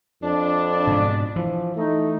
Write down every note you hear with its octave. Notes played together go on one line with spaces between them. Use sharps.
F2 D4
G#2 B2
E3 F3
A3 D#4